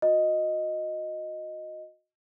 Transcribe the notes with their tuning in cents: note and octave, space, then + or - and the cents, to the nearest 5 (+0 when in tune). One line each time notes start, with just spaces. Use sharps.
F#4 -35 D#5 +0